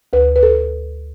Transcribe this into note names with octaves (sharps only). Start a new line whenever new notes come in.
D2 B4
B4
A4